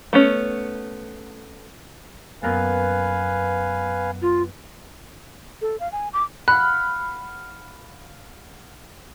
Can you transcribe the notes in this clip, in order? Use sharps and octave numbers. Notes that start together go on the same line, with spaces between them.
A3 B3 C#4
F#2 A#3 B3 B4 F5 G#5
F4
A4
F5
G#5
D6
F5 F#5 B5 F#6